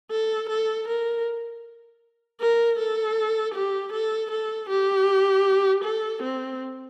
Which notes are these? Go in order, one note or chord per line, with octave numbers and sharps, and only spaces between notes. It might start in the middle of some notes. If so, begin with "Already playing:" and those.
A4
A4
A#4
A#4
A4
G4
A4
A4
G4
A4
C4